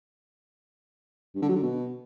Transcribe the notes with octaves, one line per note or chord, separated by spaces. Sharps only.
G2
D3
F#3
D3
B2